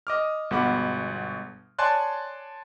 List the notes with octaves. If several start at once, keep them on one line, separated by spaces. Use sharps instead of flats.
D#5 D6 F6
G1 B2 G#3 F#5 B5 D6
C#5 D5 G#5 A5 C6 F#6